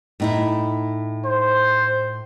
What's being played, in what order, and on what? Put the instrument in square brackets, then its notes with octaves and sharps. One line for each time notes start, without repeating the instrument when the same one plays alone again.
[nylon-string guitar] A2 D#4 E4
[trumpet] C5